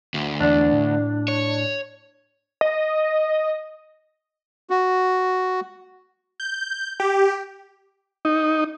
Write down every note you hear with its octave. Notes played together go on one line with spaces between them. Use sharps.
D2
E2 D3 D4
A2
C#5
D#5
F#4
G6
G4
D#4